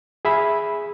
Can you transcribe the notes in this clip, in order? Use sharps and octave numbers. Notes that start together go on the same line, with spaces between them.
G#4 E5 B5